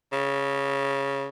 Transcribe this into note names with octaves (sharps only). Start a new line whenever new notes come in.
C#3